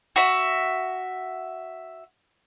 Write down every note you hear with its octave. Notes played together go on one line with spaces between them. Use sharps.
F#4 E5